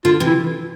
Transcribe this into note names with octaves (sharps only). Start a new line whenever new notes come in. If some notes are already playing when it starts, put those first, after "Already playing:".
D3 F4
C3 E3
E4